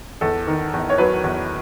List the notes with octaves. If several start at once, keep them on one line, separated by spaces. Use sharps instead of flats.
E2 A4
D#3
E2
C#5
F#3 B4
E2